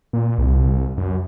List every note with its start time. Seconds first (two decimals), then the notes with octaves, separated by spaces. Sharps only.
0.13 A#2
0.38 C2
0.98 F#2